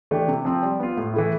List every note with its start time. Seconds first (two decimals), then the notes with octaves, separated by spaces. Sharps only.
0.11 E3 A3 D4 G4
0.28 C3
0.45 F3 C4
0.63 G3
0.80 B3 F4
0.97 A2
1.13 E3 A3 E4